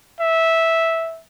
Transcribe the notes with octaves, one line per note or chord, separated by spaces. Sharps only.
E5